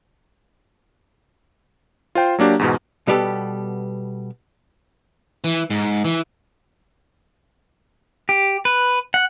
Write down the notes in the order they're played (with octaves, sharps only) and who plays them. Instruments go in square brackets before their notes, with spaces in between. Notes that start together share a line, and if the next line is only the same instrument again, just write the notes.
[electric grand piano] F4 C5 G5
F#3 A#3 D4 G4
E2 G#2 B2
[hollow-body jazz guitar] B2 G3 B3 G4 A4
[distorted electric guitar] E3
G#2
E3
[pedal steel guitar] G4
B4
F#5